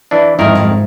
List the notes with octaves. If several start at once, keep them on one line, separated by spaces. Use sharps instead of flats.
E3 D4
F2 G#2 D#3 E4 A#4
G#2